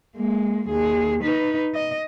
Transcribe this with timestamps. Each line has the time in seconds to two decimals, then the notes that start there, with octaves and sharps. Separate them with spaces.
0.16 G#3 A#3
0.69 D#2 G#4
1.23 D#4 B4
1.75 D#5